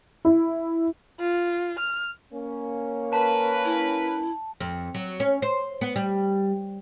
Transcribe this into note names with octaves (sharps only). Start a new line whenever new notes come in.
E4
F4
F6
A#3 C#4
A#4 B4 A5
E4
F2
F#3
C#4
C5
B3
G3